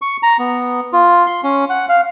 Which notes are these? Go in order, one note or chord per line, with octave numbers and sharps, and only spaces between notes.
C#6
A#5
B3
F4
C6
C#4
F#5
F5